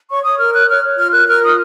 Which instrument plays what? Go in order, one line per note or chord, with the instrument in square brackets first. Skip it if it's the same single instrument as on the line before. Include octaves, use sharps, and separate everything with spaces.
[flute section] C#5 C#6
C#5 D#6
A#4 F6
C#5 F#6
C#5 F6
C#5
F4 F6
A#4 F#6
A#4 F6
F4 D#6